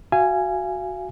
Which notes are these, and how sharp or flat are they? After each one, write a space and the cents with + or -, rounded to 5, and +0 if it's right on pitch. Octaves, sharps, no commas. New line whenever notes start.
F#4 +0 F5 -35 G#5 +0